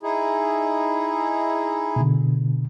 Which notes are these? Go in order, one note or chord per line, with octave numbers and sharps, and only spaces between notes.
D#4 E4 G#4
B2 D3